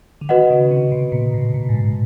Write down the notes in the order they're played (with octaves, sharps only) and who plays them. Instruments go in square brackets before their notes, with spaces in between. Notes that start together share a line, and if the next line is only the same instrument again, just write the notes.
[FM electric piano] D3
[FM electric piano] D#3 [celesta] F#4 B4 D#5 F#5
[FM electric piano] C#3
C3
B2
A#2
A2
A#2
G#2
A2